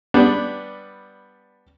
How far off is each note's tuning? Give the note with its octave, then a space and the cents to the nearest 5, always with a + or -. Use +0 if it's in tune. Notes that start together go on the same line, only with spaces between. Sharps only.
G3 +0 B3 +0 D4 +0